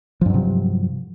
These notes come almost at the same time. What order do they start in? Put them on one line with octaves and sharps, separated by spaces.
F3 G2 F#3 C3